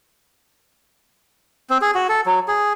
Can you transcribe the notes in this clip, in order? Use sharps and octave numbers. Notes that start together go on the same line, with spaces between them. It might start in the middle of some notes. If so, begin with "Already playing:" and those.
C4
G#4
F#4
A4
F#3
G#4